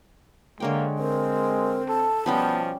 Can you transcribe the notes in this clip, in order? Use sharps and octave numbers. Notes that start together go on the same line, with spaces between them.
D3 G#3 A#3 C#5 G5
C4 A#4
A4 A5
B2 F3 G3 B3 C#4 G4